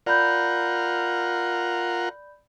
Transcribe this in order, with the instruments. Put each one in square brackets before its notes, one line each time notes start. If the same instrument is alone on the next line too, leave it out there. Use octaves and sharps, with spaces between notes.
[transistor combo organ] F4 A#4 F#5 [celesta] D5 B5 G6